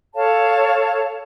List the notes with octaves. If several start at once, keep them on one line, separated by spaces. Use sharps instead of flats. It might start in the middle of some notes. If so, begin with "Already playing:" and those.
A4 C#5 F5 A5